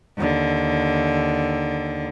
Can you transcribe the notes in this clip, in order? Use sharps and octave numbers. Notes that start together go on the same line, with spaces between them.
D#2 D3